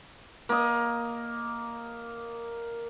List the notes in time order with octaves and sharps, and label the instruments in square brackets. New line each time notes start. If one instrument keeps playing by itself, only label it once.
[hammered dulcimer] A#3 D#5